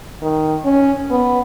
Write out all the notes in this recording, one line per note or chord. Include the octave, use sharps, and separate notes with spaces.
D#3
C#4
B3